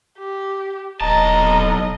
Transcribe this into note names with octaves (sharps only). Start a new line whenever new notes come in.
G4
D#1 B1 D#5 A5 A#5